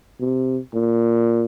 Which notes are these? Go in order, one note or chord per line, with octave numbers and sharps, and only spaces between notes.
C3
A#2